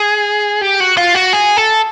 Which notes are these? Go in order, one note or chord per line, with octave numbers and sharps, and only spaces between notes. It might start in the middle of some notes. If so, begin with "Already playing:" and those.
Already playing: G#4
G4
F#4
F4
F#4
G#4
A4